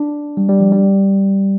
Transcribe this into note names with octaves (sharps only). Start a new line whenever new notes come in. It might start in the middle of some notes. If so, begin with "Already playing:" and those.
Already playing: D4
G3
G3
F3
G3